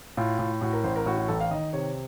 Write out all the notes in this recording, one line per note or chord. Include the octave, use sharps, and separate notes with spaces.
A2 F4
A2
A2 F#4
A#4
A1 C5
A#4
A2 F#4
F#4
A1 A4
F5
D#3 D#5
C3 C#5